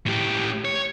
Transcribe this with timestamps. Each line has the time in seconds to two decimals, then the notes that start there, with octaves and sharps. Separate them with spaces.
0.07 A2 G4
0.65 C#5